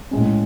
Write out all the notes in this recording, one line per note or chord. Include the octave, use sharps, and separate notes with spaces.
A2 G#3 C#4